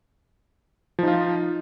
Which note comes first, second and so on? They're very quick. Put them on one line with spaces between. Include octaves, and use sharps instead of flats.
F3 D#4 F4